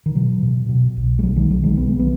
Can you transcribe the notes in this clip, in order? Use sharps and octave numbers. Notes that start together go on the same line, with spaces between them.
D#3
B2 F#3
B2
B2
B1
G#3
B1 F#3
D#3 G#3
B1 F#3
D#3 G#3
B1 B3
G#3
F#3 B3